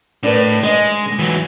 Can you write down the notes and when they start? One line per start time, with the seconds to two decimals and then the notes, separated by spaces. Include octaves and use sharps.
0.23 A2 D4 A#4 B4
0.63 G#3 D#5
1.06 D3 G#3
1.19 E3 F#3